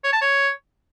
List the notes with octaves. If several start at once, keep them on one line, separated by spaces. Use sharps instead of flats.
C#5
A5
C#5